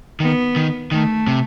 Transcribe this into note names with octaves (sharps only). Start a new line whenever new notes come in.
D#3 B3
D#3
D#3 A3
C3